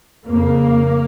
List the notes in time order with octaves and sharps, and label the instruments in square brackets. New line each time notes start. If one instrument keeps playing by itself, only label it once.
[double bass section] F2 C#3 A#3